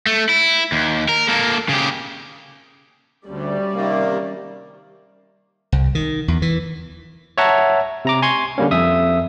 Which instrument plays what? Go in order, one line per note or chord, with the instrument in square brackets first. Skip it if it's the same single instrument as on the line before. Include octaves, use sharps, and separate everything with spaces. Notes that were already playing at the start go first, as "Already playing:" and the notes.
[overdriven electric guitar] A3
E4
D#2
A#4
A#3 A4
C#3 G4
[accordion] D2 [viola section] G3 C#4 D5
[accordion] C3 D#3 A#3
[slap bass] C2
D#3
E2
E3
[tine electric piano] C#5 E5 F#5 A5 A#5
C3 A#5 D6
G#5 C6 C#6 G#6
D3 G3 A#3 C#4
F2 E5 D#6